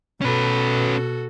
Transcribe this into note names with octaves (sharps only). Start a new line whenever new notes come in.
B2 C#4 F#4 A4 B4